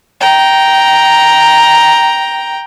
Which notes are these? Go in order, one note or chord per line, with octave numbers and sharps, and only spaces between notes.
G5 A#5